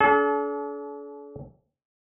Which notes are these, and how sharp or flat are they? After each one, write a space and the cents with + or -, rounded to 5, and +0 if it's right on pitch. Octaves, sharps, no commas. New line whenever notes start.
D4 -40 A4 -45